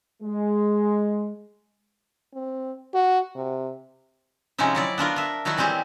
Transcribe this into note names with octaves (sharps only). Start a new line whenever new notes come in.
G#3
C4
F#4
C3
C3 F3 G#3 C#4 D#4 E4
F#3 E4 D5
B3 D4 F4 A#4
A#4 E5
D#3 F#3 D#4 E4 F#4
E3 G3 C4 G4 G#4